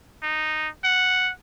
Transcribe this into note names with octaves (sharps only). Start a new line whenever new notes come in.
D#4
F#5